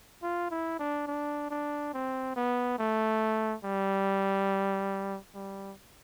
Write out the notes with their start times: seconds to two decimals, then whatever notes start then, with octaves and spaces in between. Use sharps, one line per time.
0.23 F4
0.51 E4
0.79 D4
1.08 D4
1.51 D4
1.94 C4
2.36 B3
2.79 A3
3.65 G3
5.35 G3